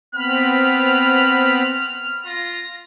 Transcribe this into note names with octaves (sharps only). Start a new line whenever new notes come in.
B3 C4 B5 F6
F4 A#6